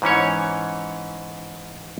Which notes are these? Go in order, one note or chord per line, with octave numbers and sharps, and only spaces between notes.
G#2 E3 C#4 C#5